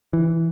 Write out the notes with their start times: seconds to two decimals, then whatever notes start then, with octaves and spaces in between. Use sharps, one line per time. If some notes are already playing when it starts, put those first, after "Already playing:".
0.13 E3